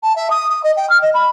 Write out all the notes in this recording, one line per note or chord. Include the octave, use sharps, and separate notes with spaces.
A5
E5
D#6
D#6
D#5
G5
F6
D#5
B5